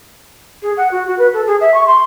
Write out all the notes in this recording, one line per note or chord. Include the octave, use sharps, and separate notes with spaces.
G#4
F#5
F#4
F#4
B4
A4
G#4
E5
C#6
C6